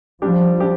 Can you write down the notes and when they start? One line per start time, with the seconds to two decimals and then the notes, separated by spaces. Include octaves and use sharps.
0.22 F3 G3 D4 G4
0.60 D4 G4